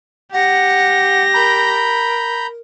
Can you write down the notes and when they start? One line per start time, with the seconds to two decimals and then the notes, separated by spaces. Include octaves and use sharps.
0.32 G4 F#5 A#6
1.34 A#4 A#5 B5 G6